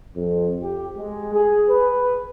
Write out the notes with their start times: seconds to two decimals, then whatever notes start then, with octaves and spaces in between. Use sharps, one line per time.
0.15 F2
0.61 G4
0.97 G#3
1.33 G#4
1.69 B4